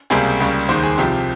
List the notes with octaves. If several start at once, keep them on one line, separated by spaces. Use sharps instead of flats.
C#2 C3 G3 A#3 G#4
C#2 C#3 G3 A#3
D#2 D#3 G#3 C5
G#4
C2 C3 F3 G4